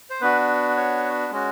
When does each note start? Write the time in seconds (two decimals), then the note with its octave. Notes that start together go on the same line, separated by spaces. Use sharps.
0.10 C5
0.21 B3 D4 F#4 B4
0.77 C#5
1.31 G#3 C#4 F#4